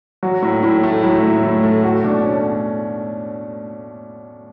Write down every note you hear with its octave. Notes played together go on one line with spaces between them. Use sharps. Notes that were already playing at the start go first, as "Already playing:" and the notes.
F#3 F#4
A2
A2 E4
A3
F#3 E4
A2
A2
A3
A3 F#4
B2 D4
C#4